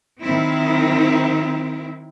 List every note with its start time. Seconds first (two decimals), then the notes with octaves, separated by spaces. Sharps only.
0.20 D#3 F#3 C4 E4